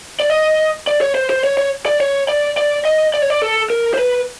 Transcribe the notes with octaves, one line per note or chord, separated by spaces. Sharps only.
D5
D#5
D5
C#5
C5
C5
C#5
C#5
D5
C#5
D5
D5
D#5
D5
C#5
D5
A4
A#4
C5
B4